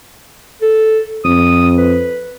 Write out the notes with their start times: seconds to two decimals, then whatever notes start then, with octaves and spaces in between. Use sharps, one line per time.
0.62 A4
1.25 F2 D#6
1.77 B4